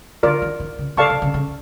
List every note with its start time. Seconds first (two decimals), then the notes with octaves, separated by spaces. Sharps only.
0.23 D3 F4 A#4 D5
0.42 D#3
0.60 D#3
0.79 C#3
0.97 C#3 A4 D5 F5 A5 C#6
1.10 C3
1.22 C#3
1.34 C#3